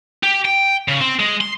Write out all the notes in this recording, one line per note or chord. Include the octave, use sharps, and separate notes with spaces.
G4
G5
C#3
C4
G#3
C6